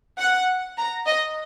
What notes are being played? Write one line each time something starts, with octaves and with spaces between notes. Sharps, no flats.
F#5
A#5
D#5